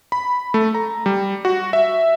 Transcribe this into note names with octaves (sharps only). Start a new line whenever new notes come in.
B5
A3
A#5
G3
F#4
E5